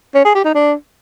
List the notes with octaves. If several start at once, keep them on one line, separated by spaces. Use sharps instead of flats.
C#4
G#4
G4
D#4
D4